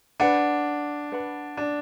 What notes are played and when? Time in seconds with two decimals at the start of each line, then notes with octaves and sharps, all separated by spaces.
0.20 D4 B4 F#5 B5
1.12 B4 F#5 B5
1.57 D4